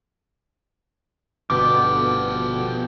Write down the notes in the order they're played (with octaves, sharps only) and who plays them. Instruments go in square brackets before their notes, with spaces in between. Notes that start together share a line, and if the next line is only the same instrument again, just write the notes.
[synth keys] G1 D3 B3 [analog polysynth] B2 [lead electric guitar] F3 G4 [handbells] D6